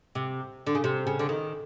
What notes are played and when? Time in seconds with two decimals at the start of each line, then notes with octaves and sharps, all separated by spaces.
0.15 C3
0.67 D3
0.75 C#3
0.84 C3
1.07 C#3
1.19 D3
1.29 D#3